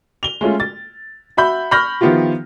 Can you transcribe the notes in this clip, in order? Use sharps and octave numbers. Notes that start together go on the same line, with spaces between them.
F7 G7
G#3 A3 C#4 F4
A6
F#4 E5 B5 G6
B5 C#6 F6 G6 A#6
D#3 F3 B3 E4 F4 G4